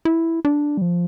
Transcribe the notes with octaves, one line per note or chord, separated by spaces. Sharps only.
E4
D4
G3
F3